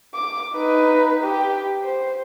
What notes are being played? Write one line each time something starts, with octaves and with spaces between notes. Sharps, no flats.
D6
D#4 B4
G4
C5